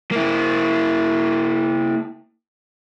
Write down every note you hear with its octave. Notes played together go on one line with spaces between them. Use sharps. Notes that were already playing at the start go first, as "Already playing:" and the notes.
A#3 E4